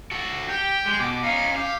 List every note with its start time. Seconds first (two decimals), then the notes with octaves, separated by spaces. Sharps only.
0.11 F#4 A4
0.49 G4 G5
0.86 G#3
1.00 B2 D6
1.23 C#4 D#4 F5
1.56 G4 F5